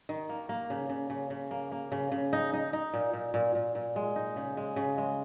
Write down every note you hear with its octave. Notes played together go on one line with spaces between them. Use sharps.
D#3
A#3
A#3
C#3
C#3
C#3
C#3
A#3
A#3
C#3
C#3
D#4
D#4
D#4
A#2
A#2
A#2
A#2
A#2
G#3
D#4
C#3
G#3
C#3
G#3